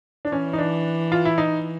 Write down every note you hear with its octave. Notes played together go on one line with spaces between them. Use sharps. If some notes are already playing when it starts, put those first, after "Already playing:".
D4
E3 C#4
D#4
D4
F4
E4
D#4